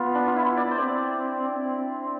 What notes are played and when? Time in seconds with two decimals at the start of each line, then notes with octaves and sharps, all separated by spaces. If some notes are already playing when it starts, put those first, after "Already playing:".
Already playing: B3 F4
0.15 D4
0.27 F4
0.36 E4
0.57 D5
0.67 B3 C5
0.78 C4 D5
1.62 C4